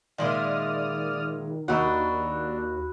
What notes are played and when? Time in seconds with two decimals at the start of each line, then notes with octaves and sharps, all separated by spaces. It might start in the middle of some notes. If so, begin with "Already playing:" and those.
0.18 A#2 D#3 G#3 E4 D5 D#6 F6
1.68 D#2 D4 D#4 F#4 B5 E6